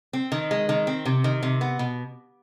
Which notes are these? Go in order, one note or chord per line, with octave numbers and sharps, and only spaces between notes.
C4
D#3
G#3
D#3
C4
C3
D#3
C3
B3
B2